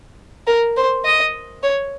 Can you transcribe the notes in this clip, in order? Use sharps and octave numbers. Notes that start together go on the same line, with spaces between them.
A#4
C5
D#5
C#5